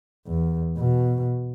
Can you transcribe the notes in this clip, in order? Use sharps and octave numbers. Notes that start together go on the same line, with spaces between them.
E2
B2